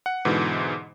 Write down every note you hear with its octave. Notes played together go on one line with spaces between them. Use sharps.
F#5
G#2 B2 D3 E3